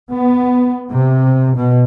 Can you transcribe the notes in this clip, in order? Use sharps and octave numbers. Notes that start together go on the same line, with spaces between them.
B3
C3
B2